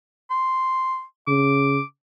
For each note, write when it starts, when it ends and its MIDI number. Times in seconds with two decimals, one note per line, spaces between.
0.30 1.03 84
1.28 1.80 49
1.28 1.83 86